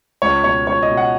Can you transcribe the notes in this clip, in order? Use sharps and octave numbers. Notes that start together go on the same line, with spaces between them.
C#2 C#5
B2 C#5
C#2 C#5
D#5
B2
F#5